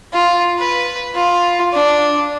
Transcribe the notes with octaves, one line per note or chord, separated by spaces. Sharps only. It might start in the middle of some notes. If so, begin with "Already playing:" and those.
F4
B4
F4
D4